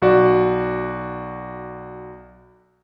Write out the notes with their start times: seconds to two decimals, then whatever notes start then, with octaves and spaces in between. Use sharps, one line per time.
0.02 B1 F#4 D5